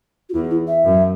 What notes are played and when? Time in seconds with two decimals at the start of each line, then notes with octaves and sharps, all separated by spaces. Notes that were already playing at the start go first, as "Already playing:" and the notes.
0.29 F#4
0.34 E2 E4
0.51 E4
0.68 E5
0.85 F#2